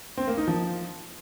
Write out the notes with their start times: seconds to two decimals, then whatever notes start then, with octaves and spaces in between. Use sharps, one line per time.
0.17 C4
0.27 A#3
0.38 D#4
0.48 F3